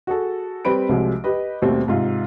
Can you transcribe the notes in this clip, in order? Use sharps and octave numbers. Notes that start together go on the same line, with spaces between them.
F#4 G#4 A4
G3 C4 B4 B5 D7
C2 C3 F3 F#3 G#3
G4 B4 D#5
D#2 B2 G3 A3 C4
G#2 C3 F4